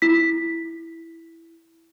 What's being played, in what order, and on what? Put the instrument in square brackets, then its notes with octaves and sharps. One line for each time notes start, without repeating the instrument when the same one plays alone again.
[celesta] E4 B6